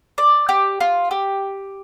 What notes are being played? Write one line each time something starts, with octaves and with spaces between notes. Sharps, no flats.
D5
G4
F4
G4